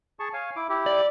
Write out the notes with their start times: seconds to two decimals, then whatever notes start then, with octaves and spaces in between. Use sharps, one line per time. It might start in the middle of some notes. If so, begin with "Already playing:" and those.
0.20 G#4 A5 C#6
0.33 C#5 F5 G#5
0.56 E4 D6
0.69 E4 G4
0.86 D5